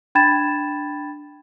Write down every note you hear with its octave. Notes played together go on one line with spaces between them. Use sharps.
D4 G5 B5 G#6 A6 E7